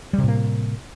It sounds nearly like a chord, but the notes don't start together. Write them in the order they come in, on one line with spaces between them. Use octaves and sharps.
G3 C3 A2 A#3